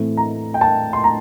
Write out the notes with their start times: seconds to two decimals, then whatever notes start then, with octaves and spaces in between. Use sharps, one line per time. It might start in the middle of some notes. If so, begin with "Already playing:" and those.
Already playing: A2 E3 A3 C4 E4
0.17 A#5
0.54 G5
0.61 A5
0.93 C6
1.04 A#5